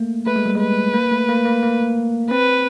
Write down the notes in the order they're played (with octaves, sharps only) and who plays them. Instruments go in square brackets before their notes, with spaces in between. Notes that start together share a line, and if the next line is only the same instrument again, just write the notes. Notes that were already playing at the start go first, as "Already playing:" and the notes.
Already playing: [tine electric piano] A3 A#3
[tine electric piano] A3 [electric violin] B4
[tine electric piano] G#3
G3
G#3
[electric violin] B4
[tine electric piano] A#3
A3
A#3
A#3
A#3
[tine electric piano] C4 [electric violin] B4